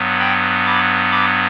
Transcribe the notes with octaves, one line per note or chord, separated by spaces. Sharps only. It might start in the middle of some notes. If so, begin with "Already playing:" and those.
Already playing: G2 F#3 B3
G5 B5
B5 D6
B5 D6